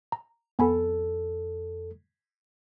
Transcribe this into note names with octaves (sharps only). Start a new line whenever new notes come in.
A#5
F2 B3 A4 G#5 B5